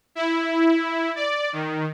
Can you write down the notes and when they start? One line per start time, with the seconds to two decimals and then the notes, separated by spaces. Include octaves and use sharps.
0.15 E4
1.16 D5
1.53 D#3